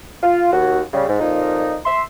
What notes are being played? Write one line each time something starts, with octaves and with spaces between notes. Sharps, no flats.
F4
D#2 F#4
C#3 G3
G#2
F2 A#2 A#3 D#4
E5 C6